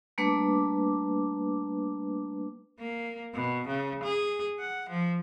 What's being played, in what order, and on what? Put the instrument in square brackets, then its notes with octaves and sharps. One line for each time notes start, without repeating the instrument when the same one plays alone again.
[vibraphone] G3 A3 A#3 D4 B4 D6
[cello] A#3
B2
C#3
G#4
F#5
F3